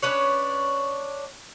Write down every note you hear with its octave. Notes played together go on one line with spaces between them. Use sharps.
C#4 D4 B4 C#5